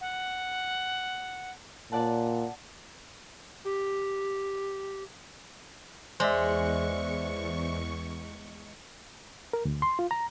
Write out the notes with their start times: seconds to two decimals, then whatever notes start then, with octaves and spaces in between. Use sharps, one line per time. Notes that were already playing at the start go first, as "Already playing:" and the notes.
0.01 F#5
1.92 A#2 D5 F#5 A5
3.65 G4
6.20 E2 G#3 C5 D5 E5 C#6
9.53 A#4
9.65 D2
9.82 C6
9.99 F4
10.11 A#5